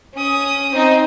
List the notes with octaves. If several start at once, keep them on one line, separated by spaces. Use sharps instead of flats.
C#4 D#6
C4 D#4